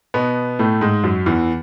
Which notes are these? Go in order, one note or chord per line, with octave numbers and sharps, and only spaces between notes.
B2 B3
A2 A3
G#2 G#3
F#2 F#3
E2 E3